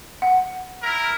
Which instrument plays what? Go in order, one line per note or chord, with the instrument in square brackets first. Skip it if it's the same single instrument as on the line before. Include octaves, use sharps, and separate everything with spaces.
[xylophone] F#5
[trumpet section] E4 A#4